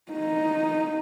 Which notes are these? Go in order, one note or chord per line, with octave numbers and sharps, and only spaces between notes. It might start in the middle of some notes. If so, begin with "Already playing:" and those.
D#4